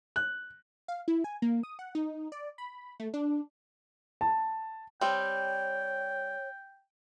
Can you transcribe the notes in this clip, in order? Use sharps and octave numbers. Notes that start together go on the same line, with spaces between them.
F#6
F5
E4
G#5
A#3
D#6
F#5
D#4
D5
B5
A3
D4
A5
G3 C4 C#5 G5